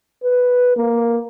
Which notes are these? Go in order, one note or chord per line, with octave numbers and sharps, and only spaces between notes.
B4
A#3